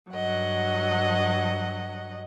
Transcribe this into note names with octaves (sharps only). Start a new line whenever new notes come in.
G2 F#3 D#5 F#5